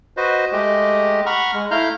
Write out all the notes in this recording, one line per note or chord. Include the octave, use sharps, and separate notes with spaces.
F#4 B4 C5 D#5
G#3 A3 G4 D#5
F#5 A#5 B5 C#6 F6
G#3
A3 E4 F5 A#5 F6 G6